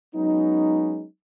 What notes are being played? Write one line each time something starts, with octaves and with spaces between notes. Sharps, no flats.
F#3 G#3 B3 C#4 D#4